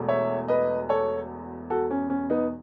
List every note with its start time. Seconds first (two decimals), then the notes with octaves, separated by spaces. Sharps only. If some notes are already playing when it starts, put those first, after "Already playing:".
Already playing: E1 E2 B2 A3
0.09 C#5 E5
0.48 B4 D#5
0.89 A4 C#5
1.70 F#4 A4
1.91 C#4
2.10 C#4
2.30 B3 D#4